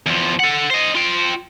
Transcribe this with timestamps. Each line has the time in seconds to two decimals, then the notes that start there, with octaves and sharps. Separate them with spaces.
0.06 E2 F3
0.40 A4 F#5
0.70 C5 D#5
0.95 F4 G5